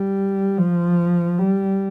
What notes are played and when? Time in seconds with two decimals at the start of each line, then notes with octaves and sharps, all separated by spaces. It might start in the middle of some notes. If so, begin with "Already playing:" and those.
Already playing: G3
0.58 F3
1.39 G3